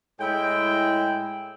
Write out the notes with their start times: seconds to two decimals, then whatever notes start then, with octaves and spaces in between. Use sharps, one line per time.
0.20 A2 G#3 E4 G5